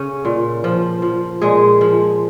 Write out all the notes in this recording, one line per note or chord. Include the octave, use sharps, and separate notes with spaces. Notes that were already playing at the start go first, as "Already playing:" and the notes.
Already playing: C#3 C#4
A#2
F3
F3
A#2 G#3 G#4
F3